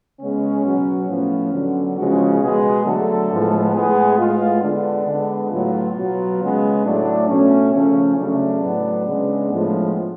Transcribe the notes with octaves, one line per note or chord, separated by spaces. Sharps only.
C#3 G#3 B3 C#4
B2 F#3 B3
A2 F3 B3 C#4
D3 F#3 B3
C#3 F3 G#3 B3 F#4
B2 G#3 B3 G#4
D3 F#3 A3 A4
A2 F3 G#3 B3
A2 G#3 B3 G#4
A2 G#3 B3 F4
D3 G#3 B3 D4
D3 G#3 B3
A2 F#3 B3 F4
B2 F#3 B3
C#3 G#3 B3
A2 F#3 A3 D4
B2 A3 C#4
C#3 F3 A3 C#4
C#3 F#3 A3 D4
A2 F#3 B3
C#3 G#3 B3
A2 F3 G#3 B3